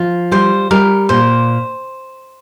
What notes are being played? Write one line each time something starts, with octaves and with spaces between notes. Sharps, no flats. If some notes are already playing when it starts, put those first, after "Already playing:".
Already playing: F3 F4
G3 C5
G3 A#4
A#2 C5